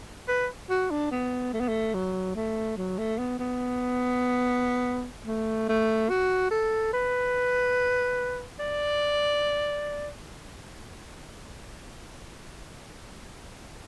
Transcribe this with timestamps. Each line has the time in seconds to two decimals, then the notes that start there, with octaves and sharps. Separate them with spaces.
0.28 B4
0.70 F#4
0.91 D4
1.11 B3
1.53 A3
1.60 B3
1.68 A3
1.94 F#3
2.36 A3
2.77 F#3
2.98 A3
3.18 B3
3.39 B3
5.26 A3
5.69 A3
6.09 F#4
6.51 A4
6.93 B4
8.59 D5